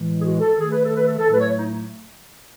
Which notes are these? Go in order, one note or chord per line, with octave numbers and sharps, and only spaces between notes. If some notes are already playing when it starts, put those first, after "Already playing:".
Already playing: A2 E3 G#3
G#4
F#4
A4
D#3 A3 G#4
B4
A4
B4
A4
A4
A2 F#3 A3 B4
C#5
D#4